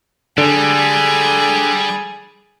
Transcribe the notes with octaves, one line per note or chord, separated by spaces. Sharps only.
D3 G3 G#4